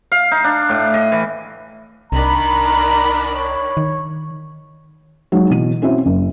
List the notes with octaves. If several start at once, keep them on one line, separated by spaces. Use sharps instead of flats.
F5
D#4
D4
A2
D#5
E3
C2 D#3 D4 A#5 B5
C#5
D#3
F#3 G#3 D#4
B2 E3 D#7
C4 C#4 E4 F#4 E5
F#1